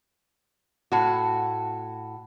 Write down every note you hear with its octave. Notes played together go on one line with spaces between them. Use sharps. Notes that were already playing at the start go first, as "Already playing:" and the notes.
A2 F#4